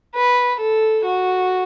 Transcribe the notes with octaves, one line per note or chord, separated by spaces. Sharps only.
B4
A4
F#4